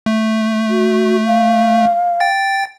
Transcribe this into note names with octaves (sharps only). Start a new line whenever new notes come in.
A3
F#4
F5
G5 A6